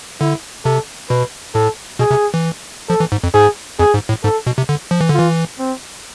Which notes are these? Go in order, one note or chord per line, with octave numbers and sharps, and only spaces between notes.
D3 E4
C3 A4
B2 B4
A2 A4
B2 G#4
C3
E3
F3 A4
E3
G#2
F2
G#2 G#4
F2 G#4
G#2
A2
G#2 A4
B2
C3
D3
F3
E3
D3
E3 F4
C4